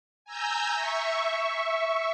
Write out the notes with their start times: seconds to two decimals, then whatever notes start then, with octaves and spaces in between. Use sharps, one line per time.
0.25 G#5 A#5 E6 G6
0.73 E5 C#6